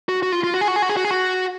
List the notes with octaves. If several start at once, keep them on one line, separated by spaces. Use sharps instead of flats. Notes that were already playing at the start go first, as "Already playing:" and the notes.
F#4
F#4
F4
F4
F#4
G#4
F#4
G#4
F#4
G#4
F#4
G#4
F#4